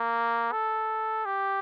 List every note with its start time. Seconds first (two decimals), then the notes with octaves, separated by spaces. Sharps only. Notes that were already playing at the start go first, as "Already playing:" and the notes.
Already playing: A#3
0.52 A4
1.25 G4